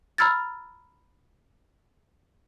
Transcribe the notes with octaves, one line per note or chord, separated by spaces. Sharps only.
A#5 B5 E6 F6 G#6 A6